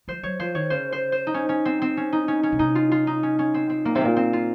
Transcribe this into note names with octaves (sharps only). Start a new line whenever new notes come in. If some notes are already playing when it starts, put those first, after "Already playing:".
F3 C5
F#3 C#5
F3 C5
D#3 C#5
C#3 C5
C5
C5
D#4
C#4
C#4
C4
C4
C#4
D#4
C#4
C#4
C#3
C3 D#4
F4
F4
D#4
C#4
C#4
C4
C4
A#2 A#3
C3 C4
A#2 A#3
C4
F4